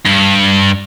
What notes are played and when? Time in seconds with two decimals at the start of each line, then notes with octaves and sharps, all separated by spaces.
0.06 G2